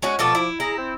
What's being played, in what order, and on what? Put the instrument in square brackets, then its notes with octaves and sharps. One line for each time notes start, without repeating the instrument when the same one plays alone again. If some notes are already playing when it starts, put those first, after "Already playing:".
[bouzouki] G#3 C#4 F#4
[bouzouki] B2 A3 A4 [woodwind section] F3 D6
[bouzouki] E4
[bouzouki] E4 [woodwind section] G#4 A#5
[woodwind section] C4